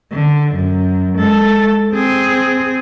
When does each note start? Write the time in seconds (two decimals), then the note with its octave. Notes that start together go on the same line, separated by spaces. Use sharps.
0.12 D3
0.55 F#2
1.18 G#3 A4
1.92 C4 G#4